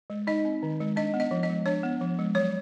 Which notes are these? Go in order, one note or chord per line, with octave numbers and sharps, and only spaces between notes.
G#3
D#4 D#5
C4
D#3
G#3
D4 D#5
B3
D#5
F3
D#5
G#3
D4 C#5
B3
F3
G#3
F#3 C#5